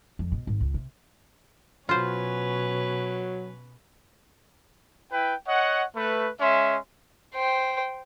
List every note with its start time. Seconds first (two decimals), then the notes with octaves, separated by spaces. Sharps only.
0.19 F2
0.32 B2
0.47 G#1
0.61 C#2
0.74 C3
1.89 B2 F#3 C#4 F4 B4 C5
5.12 E4 B4 G5
5.47 C#5 D#5 F#5
5.95 A3 B4
6.41 G#3 C#4 E5 C6
7.34 C5 G5